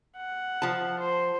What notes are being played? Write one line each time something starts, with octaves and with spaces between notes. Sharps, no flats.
F#5
F3 A5
C5